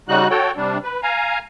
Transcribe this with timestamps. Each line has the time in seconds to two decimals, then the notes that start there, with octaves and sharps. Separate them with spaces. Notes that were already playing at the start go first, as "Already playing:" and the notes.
0.09 C#3 G3 D#4 F#4 F#6
0.30 F#4 A4 C#5 G5
0.57 C3 G3 D4
0.84 B4
1.03 F5 G#5 A#5